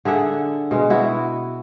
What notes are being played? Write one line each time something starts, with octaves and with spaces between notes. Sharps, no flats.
D3 G#4 E5 F#5
B2 G#3
B3 E4 F#4